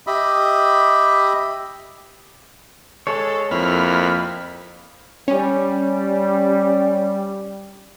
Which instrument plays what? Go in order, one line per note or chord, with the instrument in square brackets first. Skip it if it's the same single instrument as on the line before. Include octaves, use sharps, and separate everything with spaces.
[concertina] G4 D#5 E5 B5
[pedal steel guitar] G#3 G#4 C#5 [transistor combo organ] A4
[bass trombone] F2 [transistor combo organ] A#3 B5 F6 [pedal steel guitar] E4
[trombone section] G3 [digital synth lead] C#4